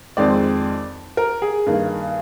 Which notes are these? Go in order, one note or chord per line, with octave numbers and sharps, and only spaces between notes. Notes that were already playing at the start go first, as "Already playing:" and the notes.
F2 D#3 G#3 C4 D5
A#4
G#4
G2 D#3 A#3